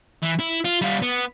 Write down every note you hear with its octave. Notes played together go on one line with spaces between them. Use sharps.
E3
E4
F4
G3 F4
B3